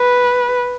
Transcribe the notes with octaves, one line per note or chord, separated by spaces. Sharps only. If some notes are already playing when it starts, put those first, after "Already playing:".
Already playing: B4